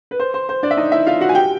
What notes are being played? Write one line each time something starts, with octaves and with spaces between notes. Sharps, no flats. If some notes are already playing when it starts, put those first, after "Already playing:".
B4
C5
C5
C5
D4 D5
E5
D#4 D#5
E4 E5
F4 F5
F#4 F#5
G#5
G4 G5